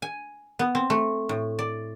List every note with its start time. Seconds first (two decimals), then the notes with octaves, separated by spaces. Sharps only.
0.02 G#5
0.59 B3
0.75 C4
0.90 A3
1.29 A2
1.59 D5